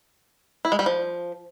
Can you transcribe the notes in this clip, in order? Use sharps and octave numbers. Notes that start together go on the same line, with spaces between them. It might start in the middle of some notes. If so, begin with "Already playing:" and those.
E4
G#3
G3
F3